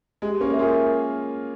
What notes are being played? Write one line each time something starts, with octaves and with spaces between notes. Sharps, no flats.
G#3 G4
A#3 C#4
A#4 E5
F4 G#4